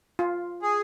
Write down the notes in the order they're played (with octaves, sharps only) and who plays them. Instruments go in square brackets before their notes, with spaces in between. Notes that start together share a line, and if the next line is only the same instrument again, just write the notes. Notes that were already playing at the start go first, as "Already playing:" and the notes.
[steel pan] F4
[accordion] G#4